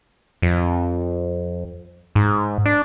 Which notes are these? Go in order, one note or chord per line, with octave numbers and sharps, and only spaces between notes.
F2
G#2
D4